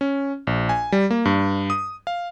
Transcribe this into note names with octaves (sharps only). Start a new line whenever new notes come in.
C#4
A#1
G#5
G3
A#3
G2
D#6
F5